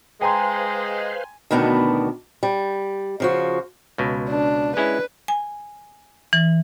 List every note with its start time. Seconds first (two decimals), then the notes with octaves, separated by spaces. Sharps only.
0.21 G#3 B4 C5 F5 G5 G#5 A#5 C6
1.51 D2 B2 D#3 B3 D4
2.43 G3
3.20 C#3 F3 F#4
3.98 C#2 B2
4.30 D4
4.77 G#3 C#4 E4 B4
5.28 G#5
6.33 E3